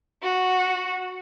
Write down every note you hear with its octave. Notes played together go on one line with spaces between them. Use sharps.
F#4